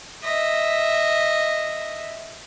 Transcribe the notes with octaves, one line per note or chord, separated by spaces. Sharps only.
D#5 E5